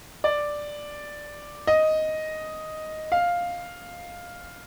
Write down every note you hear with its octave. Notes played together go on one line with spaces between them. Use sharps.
D5
D#5
F5